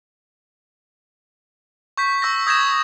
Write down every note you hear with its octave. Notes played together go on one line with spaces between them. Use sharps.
C#6 G6 B6
C#6 E6 G6 A#6
D#6 G6 G#6 A#6 B6 E7